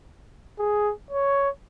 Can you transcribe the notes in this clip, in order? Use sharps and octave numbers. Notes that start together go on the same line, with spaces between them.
G#4
C#5